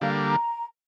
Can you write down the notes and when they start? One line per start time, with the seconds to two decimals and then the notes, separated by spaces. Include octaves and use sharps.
0.01 D3 G3 A#3 F5
0.26 A#5